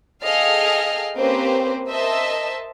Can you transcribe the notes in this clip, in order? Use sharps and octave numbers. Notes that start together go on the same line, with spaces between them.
G#4 A4 D#5 F5 G5 F6
A#3 C4 C#4 G4 B4 C5
A#4 C5 D#5 E5 A5 E6